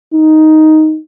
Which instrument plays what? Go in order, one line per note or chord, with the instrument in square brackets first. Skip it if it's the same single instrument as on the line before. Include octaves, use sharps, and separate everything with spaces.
[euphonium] D#4